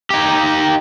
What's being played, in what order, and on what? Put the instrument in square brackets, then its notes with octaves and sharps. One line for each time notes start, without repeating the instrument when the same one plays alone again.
[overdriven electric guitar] D#4 G4